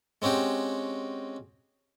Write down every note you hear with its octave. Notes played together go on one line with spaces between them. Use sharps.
G#3 C4 C#4 F#4 G4